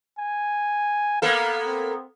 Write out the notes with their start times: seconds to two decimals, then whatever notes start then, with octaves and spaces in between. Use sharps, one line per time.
0.18 G#5
1.22 A#3 B3 A4 F5
1.66 C4